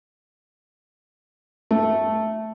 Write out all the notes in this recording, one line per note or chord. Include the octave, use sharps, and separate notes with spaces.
A3